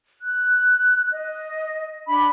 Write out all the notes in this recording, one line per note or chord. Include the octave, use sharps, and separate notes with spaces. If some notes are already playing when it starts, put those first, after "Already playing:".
F#6
D#5
D4 B5